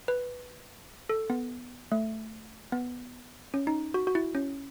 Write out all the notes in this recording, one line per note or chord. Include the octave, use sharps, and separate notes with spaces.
B4
A4
B3
A3
B3
C#4
D#4
F#4
F#4
E4
C#4